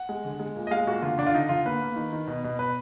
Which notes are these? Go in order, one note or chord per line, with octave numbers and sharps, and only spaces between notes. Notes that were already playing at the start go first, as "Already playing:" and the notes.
Already playing: F#5
G#3
D3
G#3
A#2
D#5
G#3 F5
A#2 F#4
D3 F4
D3 D4
F4
D3 D#4
D3 F4
A#3 B4
A#3
D#3
D#3
B2
B2
B2 B4